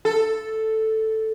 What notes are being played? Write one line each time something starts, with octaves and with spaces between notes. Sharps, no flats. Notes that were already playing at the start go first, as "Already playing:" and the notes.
A4